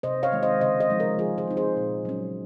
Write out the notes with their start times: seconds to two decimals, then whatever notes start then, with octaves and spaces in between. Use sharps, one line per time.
0.03 C3 C5 D#5
0.23 C#5 F5
0.32 D#3 G#3 C4
0.43 C5 D#5
0.61 C#3 C5 D#5
0.80 C5 D#5
0.90 F3 G#3 D#4
0.99 A#4 C#5
1.19 F3 F4 G#4
1.38 G#4 C5
1.48 C4 D#4
1.57 G#4 C5
1.77 A#2
2.05 F#3 C#4